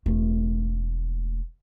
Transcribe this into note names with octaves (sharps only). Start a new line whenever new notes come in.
E1 A3